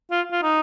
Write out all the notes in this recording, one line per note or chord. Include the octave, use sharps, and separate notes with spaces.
F4
F4
D#4